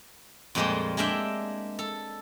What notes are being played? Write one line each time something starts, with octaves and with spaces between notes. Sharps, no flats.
F2 A#2 G3 G#3 A#3 C5
G#3 A#3 D4 E5 G5
A4